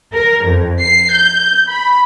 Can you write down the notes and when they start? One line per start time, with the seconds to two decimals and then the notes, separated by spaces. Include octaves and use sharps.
0.13 A#4
0.45 F2
0.80 C7
1.12 G6
1.69 B5